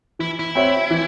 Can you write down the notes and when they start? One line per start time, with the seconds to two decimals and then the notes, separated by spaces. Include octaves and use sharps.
0.19 E3 E4
0.39 E4
0.55 C4 F#4 C#5 E5
0.90 E3